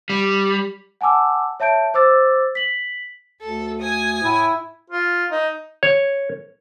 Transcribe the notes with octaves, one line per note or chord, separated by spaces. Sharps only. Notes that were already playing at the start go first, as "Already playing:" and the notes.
G3
F#5 G#5 A5 D6 E6
C#5 E5 A5 G6 D7
C5 D6 E6 A6
B6 F#7
D2 A4
G#5 D#6
A2 E4
F4
D#4
C#5